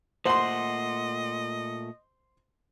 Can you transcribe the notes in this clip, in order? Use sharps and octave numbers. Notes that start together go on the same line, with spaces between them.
A#2 A3 C5 D#5 F#5 C6